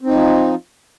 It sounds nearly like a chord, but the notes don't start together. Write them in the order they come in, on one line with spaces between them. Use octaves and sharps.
C4 D#4 F3